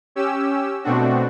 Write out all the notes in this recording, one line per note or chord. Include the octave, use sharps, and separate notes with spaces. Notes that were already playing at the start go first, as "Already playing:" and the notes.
C#4 G4 E6
B2 A3 C4 D4 F#4